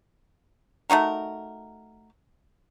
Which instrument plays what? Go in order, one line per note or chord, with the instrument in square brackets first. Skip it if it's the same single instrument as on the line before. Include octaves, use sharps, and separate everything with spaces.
[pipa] A3 D#4 F#4 A#4